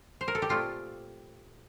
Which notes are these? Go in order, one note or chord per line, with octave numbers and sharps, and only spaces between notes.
C5
A#4
A4
G4
A#2 A3 C4 F4